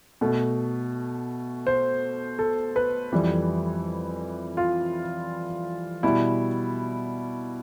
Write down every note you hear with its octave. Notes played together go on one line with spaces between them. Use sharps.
B2 A3
C5
A4
B4
F2 E3 G3
F4
B2 G3 E4